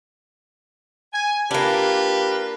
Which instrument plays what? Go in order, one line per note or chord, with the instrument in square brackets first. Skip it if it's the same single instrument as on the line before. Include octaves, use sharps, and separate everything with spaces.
[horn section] G#5
[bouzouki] A#3 D4 [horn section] F4 G4 B4